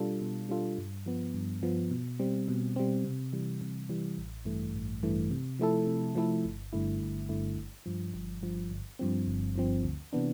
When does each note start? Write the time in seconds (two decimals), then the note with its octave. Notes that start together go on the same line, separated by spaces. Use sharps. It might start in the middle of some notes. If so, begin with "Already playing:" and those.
Already playing: B2 G3 D4 F4 A4
0.21 B2
0.49 G3 D4 F4 A4
0.78 G2
1.06 F3 B3
1.34 G2
1.63 F3 B3
1.91 B2
2.19 G3 C4
2.48 B2
2.76 G3 C4
3.04 C3
3.33 E3 G3
3.61 C3
3.89 E3 G3
4.18 A1
4.45 G2 E3 A3
4.75 A1
5.03 G2 E3 A3
5.31 C3
5.59 F3 A3 E4 A4
5.87 C3
6.15 F3 A3 E4 A4
6.45 G1
6.73 G2 D3 A3 E4
7.00 G1
7.29 G2 D3 A3 E4
7.57 G1
7.86 G2 F3
8.14 G1
8.43 G2 F3
8.71 G1
8.99 G2 F3 C4
9.27 G1
9.56 G2 F3 C4
9.84 D2
10.13 C3 E3 B3 D4